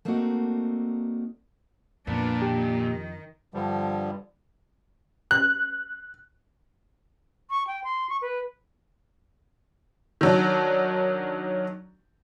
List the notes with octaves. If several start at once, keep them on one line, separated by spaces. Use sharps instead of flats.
A3 A#3 C4 D4 D#4 F#4
F2 A#2 B3 D4
D#3 G4
G2 D3 F3 G3
F#6
C#6
G5
C6
C#6
B4
D#3 F#3 D4